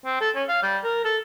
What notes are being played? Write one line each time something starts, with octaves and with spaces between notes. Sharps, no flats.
C4
A4
C#4
F5
G3
A#4
A4